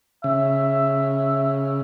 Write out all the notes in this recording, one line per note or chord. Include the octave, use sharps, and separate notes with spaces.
C#3 E5